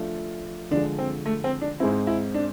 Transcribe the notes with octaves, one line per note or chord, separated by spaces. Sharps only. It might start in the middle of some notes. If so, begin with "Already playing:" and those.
Already playing: F3 A3 D4 F4
D3 F3 G#3 D4
C4
A3
C4
D4
G#2 G#3 C4 E4
E4
D4